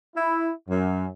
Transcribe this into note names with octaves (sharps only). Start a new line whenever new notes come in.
E4
F#2